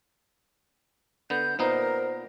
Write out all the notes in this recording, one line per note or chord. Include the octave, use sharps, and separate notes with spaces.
D3 B3 G6
A#2 B3 D#4 A#4 C5 A#5 C7